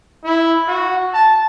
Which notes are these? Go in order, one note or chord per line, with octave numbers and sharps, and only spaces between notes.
E4
F#4
A5